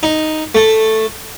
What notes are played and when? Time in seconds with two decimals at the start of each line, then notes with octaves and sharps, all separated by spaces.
0.03 D#4
0.55 A3